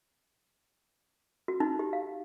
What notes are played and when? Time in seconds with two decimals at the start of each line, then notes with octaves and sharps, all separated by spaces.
1.48 F#4
1.60 D#4
1.79 G4
1.93 F5